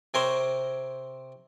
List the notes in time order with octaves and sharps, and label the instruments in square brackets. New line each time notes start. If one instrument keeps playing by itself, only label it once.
[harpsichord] C3 C4 A#4 C5 C#5 C6